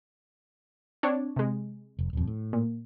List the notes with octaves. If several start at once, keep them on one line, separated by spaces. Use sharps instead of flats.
C4 D4 C#5
C3 G#3
F1
D#1 F2
A2
A#2